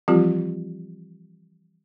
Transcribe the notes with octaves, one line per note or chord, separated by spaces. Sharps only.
E3 F3 G3 C4 F4 G4